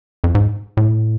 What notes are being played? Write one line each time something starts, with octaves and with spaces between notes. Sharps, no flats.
F2
G#2
A2